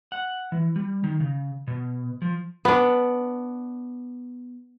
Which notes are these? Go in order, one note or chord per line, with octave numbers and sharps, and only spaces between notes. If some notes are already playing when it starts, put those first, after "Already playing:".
F#5
E3
G3
D#3
C#3
B2
F3
B3 D4